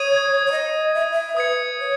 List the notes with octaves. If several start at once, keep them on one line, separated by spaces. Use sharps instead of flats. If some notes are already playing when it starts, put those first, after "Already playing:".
Already playing: C#5 D#6 G#6 D#7
C#5
D#5
E5
E5
B4 D#6 G#6 C#7
C#5